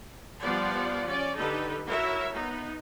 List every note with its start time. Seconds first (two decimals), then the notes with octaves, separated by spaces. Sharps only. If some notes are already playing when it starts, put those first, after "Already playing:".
0.42 F3 G3 B3 F4 D5 F#5
1.08 C#4 D5
1.39 D3 D#4 G4 A4 B4
1.87 E4 F#4 A#4 C#5 E5
2.34 B3 D#4